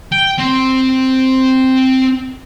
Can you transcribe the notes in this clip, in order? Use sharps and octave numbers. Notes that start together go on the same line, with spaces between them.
G5
C4